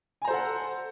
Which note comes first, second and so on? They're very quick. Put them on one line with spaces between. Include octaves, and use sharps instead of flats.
G#5 A#5 C5 A4 F#5